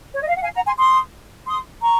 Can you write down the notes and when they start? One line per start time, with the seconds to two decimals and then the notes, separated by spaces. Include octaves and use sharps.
0.14 C#5
0.22 D#5
0.29 F5
0.36 F#5
0.42 F5 G#5
0.54 F#5 A#5
0.65 G#5 C6
0.78 C6 D#6
1.47 C6 D#6
1.81 A#5 C#6